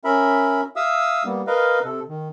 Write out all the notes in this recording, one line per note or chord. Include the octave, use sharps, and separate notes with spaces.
C#4 A#4 E5 B5
E5 F5 D#6 E6
G3 A#3 B3
A#4 B4 D#5 F5
C3 A4
D#3